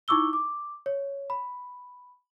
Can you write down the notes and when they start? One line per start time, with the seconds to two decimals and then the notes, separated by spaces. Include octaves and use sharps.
0.08 D#4 E4 C#6 D6 E6 G7
0.33 D6
0.86 C#5
1.30 B5